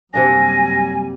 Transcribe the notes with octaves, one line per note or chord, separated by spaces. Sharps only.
F#2 C3 G3 A#3 D4 G#5 A#6